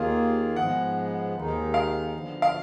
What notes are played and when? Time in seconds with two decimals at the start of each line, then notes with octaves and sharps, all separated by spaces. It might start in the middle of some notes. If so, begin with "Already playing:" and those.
Already playing: D#2 D#3 A#3 F4 G#4 F5
0.56 G#2 F3 G#3 B3 F#5
1.35 D#2 D#3 G#3 D#4
1.74 F5
2.14 D2 D3 F3 B3
2.42 F5